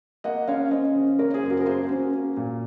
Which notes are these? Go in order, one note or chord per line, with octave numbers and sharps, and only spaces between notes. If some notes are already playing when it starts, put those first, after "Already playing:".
A#3 D#5 F#5
C#4 C#5 F5
C#4 C5 D#5
C#3
A#3 A#4 C#5
G#4 C5
F#2
F#4 A#4
A#4
A#3 G#4 C5
C#4 F#4
A#3
A#2